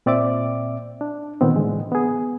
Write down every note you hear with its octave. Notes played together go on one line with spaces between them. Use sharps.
A#2 C4 D5 E5 D6
D4
A#2 D#3 B3 C4
A2 D3 E3 G#3
B3 G#4